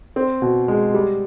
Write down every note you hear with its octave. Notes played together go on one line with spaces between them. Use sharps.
C4
B2
G#3
G3